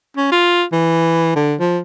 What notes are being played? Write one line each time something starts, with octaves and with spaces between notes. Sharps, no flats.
C#4
F4
E3
D3
F3